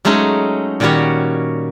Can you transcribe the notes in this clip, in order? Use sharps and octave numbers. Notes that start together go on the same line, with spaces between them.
F#3 G#3 A3 C#4 D#4
A#2 D#3 G3 C#4 F#4 C#5